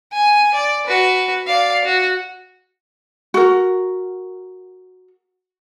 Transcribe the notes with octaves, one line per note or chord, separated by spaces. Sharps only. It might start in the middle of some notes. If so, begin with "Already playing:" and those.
G#5
D5
F#4 B4
D5 F5
F#4
F#4 A#4